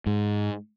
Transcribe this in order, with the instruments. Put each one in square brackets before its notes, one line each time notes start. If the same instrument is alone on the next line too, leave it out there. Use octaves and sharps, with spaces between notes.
[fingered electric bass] G#2